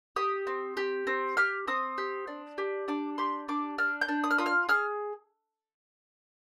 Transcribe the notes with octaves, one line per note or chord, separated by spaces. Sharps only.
G4 D#6
C4
G4
C4
G4 F6
C4 D#6
G4
D4
G4
D4 D6
G4 C6
D4 D6
D4 F6
G6
D4
D#6
F6
F4 D#6
F6
G#4 F6